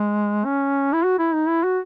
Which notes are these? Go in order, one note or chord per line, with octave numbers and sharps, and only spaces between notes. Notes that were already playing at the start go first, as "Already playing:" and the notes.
Already playing: G#3
C#4
E4
F#4
E4
D#4
E4
F#4